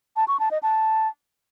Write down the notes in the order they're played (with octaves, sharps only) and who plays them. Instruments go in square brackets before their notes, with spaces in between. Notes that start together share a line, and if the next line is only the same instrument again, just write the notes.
[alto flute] A5
C#6
A5
D#5
A5